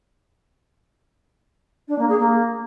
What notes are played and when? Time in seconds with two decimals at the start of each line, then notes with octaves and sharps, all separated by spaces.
1.88 D4
1.98 A#3
2.08 G#4
2.19 A#3